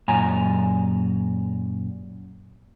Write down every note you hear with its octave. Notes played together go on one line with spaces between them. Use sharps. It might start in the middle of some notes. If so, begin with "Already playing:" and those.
F#2 A#2 G#5 A#5